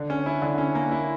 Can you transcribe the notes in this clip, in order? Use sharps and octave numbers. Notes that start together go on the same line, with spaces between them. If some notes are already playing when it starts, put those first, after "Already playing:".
Already playing: D3
C#4
E4
D3
C#4
A#3
E4